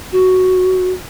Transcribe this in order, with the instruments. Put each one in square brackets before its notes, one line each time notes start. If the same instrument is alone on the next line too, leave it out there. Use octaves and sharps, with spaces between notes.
[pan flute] F#4